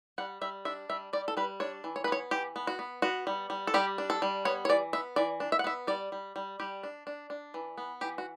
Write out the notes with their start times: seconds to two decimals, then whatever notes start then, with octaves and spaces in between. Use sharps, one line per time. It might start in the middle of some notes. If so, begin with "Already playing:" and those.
0.18 G3 F#5
0.41 G3 E5
0.65 D4 E5
0.89 G3 E5
1.13 G3 D5
1.28 A4
1.37 G3 B4
1.60 D4 C#5
1.84 E3
1.96 C#5
2.04 B4
2.08 B3 C#5
2.31 E3 G4
2.56 B3
2.67 F#4
2.79 B3
3.02 B3 F#4
3.27 G3
3.50 G3
3.67 A4
3.74 G3 G4
3.98 D4
4.10 A4
4.22 G3
4.45 B3 C#5
4.65 C#5
4.69 E3 D5
4.93 B3 E5
5.16 E3 D5
5.40 D4
5.52 E5
5.59 F#5
5.64 B3 E5
5.87 G3 D5
6.12 G3
6.36 G3
6.60 G3 G4
6.83 D4
7.07 D4
7.30 D4
7.54 E3
7.78 B3
8.01 E3 G4
8.18 F#4